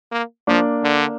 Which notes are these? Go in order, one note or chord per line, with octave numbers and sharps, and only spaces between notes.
A#3
F3 A#3 D4
D3